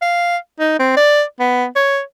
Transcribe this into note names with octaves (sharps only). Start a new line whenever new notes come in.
F5
D#4
C4
D5
B3
C#5